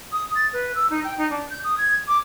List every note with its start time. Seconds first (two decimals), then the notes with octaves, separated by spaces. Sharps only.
0.12 D#6
0.35 A6
0.53 B4
0.75 E6
0.90 D#4
1.04 G5
1.18 D#4
1.30 D4
1.50 G6
1.64 D#6
1.78 G#6
2.08 D6